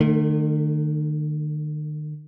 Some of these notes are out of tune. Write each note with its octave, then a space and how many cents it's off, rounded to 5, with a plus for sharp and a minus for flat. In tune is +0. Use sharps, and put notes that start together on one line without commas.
D#3 -45 A3 +15